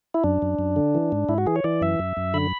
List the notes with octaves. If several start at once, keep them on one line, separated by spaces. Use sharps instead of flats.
E4
F#2 D4
F#2
F#2
D3
E3
G#2
G#2 E4
F#4
E3 G#4
C#5
E3 D5
F#2 E5
F#2
F#2
D3 B5